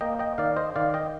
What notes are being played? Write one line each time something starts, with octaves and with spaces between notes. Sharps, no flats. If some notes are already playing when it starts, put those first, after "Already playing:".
A#3 D#5 G5
D#5 G5
D#3 D5 F5
C5 D#5
D#3 D5 F5
D#5 G5